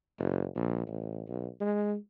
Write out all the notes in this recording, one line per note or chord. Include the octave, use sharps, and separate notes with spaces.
F#1
A#1
A1
B1
G#3